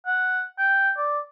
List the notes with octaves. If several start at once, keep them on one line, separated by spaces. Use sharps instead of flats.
F#5
G5
D5